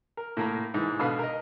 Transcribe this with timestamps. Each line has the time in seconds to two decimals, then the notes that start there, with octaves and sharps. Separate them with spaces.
0.17 A#4
0.37 A2 A#3 A#5
0.74 G#2 E3
1.00 B2 D3 B4 F5
1.19 A#4 D#5